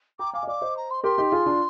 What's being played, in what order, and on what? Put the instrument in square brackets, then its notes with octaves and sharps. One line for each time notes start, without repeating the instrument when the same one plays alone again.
[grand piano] G5 A#5 [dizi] D6
[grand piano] F5 G#5 [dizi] D6
[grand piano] D#5
[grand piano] D5 F5 [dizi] D6
[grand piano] C5 D#5
[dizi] A#5
C6
[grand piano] G4 A#4 [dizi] C6
[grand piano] D#4 G4
F4 G#4
D4 F4